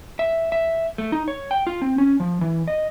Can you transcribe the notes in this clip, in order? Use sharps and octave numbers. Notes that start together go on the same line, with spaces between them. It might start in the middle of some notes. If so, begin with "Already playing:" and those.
E5
E5
A3
D#4
C#5
G5
F4
C4
C#4
F3
E3
D#5